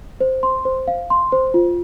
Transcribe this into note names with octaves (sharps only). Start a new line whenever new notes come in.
C5
C6
C5
F5
C6
C5
F4